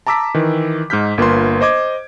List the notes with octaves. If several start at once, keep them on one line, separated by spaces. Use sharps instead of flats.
A5 A#5 D6 E6 B6
D#3 E3
G#2 D#4 F6 G6 B6
G1 A#3 F4 B4 C6
C5 D#5 D6 G#6